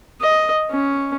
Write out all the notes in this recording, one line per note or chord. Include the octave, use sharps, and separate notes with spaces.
D#5
C#4